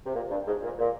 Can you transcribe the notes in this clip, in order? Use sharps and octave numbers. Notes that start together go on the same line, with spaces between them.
C3
A#2
G2
G#2
A#2
A#2